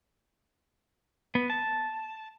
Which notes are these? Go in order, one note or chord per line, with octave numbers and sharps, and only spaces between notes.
B3
A5